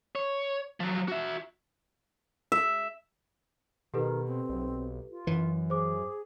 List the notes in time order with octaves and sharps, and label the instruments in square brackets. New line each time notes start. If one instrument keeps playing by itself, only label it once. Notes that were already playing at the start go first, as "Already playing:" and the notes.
[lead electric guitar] C#5
F3 F#3
F#4 E5
[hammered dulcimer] E5
[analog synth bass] B2 [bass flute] D#3 [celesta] G4 A4 B4
[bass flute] C4
[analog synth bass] B1
[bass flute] F4
[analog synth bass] F#2 [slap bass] E3
[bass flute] G#4 [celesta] C5 D6